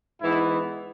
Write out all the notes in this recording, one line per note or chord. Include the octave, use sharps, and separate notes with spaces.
G#2 E3 B3 E4